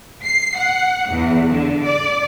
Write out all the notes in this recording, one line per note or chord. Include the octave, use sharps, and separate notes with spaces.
C7
F#5
E2
D3
D5